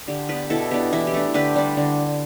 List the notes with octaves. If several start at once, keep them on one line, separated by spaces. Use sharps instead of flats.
D3 G4
B3 D4 G4 B4
B2 E4 A4
B3 D4 G4
E3 E4
G4
A3 D4
D3 G4 B4
G3 D4
D3